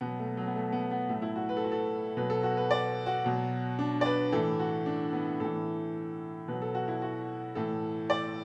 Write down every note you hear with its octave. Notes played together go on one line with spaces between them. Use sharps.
B2 F#3 B3
A3
F#3
B3
A3
B3
B3
A2 F#3 A3
E4
F#4
B4
A4
F#4
A4
B2 F#3 B4
A4
F#4
B4
D5
F#4
B2 F#3
D4
D5
B4
A2 E3 A4
F#4
D4
B3
A2 E3 A4
B2 F#3 B4
A4
F#4
E4
F#4
A2 E3 A4
D5